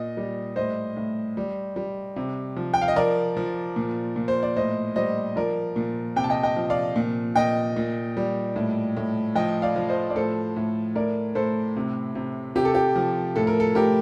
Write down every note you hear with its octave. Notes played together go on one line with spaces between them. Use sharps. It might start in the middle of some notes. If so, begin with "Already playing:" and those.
Already playing: A#2 D#5
G3
A2 C5 D#5
A2
G3
G3
C3
F3
G5
F5
D#5
F3 A#4 D5
F3
A#2
A#2
C5
D5
A2 C5 D#5
G3 C5 D#5
F3 A#4 D5
A#2
C3 G5
A5
D#5 G5
D#5 G5
F3
D5 F5
A#2
A#2 D#5 G5
A#2
G3
A2
A2
F3 D#5 G5
D5 F5
F3
C5 D#5
D5
A2 A4 C5
A2
A2 A#4 D5
A2 A4 C5
C3
C3
C3 G4
A4
G4
F3
A2 A4
A#4
A4
A2 G4 A#4